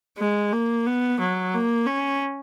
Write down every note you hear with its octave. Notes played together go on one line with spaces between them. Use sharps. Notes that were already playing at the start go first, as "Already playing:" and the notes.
G#3
A#3
B3
F#3
A#3
C#4